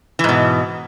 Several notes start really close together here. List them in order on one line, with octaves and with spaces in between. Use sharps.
E3 G#2 B2